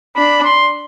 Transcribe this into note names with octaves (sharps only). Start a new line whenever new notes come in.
D4 B5
C6